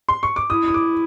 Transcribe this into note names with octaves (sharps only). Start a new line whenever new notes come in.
C6
C#6
D6
E4 D#6
D#6
D6